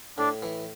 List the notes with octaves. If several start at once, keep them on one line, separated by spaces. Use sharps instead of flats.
A2 D4
E3